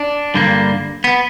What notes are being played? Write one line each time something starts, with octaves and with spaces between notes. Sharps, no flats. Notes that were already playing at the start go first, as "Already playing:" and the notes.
Already playing: D4
G2 D3 G3 A#3
B3